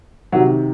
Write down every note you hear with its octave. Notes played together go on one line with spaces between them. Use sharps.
C3 D#3 F#3